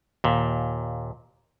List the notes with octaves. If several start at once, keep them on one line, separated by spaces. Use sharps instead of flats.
D#2 A#2